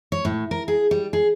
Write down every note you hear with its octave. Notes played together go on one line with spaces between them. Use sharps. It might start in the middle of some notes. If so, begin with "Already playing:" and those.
C#5
A2
A#4
G#4
G3
G#4